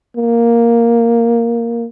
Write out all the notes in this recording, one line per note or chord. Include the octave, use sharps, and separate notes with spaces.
A#3